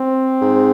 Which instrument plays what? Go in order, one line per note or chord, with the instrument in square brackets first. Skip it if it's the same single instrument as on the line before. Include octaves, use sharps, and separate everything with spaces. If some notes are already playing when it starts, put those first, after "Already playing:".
Already playing: [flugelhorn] C4
[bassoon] G#2